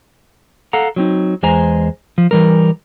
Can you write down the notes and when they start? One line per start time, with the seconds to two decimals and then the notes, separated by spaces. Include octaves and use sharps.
0.73 A4 F5 F#5 A#5
0.96 F#3 C4 D#4
1.43 E2 G#3 C5 G#5 A#5
2.18 F3
2.31 E3 G3 A#4